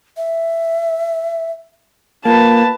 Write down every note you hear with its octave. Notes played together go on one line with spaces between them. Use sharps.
E5
A#3 F4 B4 A5